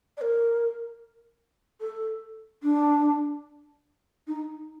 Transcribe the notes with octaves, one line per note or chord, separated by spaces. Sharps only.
D5
A#4
A4
D4
D#4